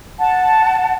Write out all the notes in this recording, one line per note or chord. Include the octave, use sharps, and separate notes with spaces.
F#5 A5